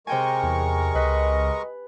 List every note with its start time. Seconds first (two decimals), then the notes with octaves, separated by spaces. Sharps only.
0.07 C3 G#3 A#4 G5 G#5 C#6
0.43 E2
0.95 C#2 B4 D#5